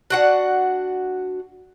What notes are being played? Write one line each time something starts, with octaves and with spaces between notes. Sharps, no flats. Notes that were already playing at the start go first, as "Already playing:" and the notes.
D4 F#4 F#5